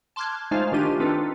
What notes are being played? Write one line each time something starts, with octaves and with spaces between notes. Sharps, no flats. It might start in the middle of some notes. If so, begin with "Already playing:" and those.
A5 C6 D6 F6 F#6 G#6
G#3 A3 D#4 F4 C5 F5
D#3 A3 D4 F4 G4 D#7
C4 D4 D#4 F4 A4 B4